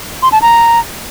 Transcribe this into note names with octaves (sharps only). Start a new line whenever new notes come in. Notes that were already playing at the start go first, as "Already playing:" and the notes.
C6
A5
A#5